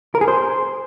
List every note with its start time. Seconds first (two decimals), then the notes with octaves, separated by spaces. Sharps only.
0.15 A#4
0.21 G#4
0.28 C5